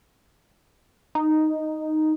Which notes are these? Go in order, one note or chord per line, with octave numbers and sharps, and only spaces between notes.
D#4